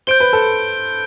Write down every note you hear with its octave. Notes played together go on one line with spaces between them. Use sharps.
C5 G6 D7 G7
B4
A4